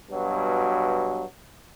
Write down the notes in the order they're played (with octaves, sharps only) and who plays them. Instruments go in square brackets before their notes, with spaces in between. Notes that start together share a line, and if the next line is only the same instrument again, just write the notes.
[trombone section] G2 B2 F#3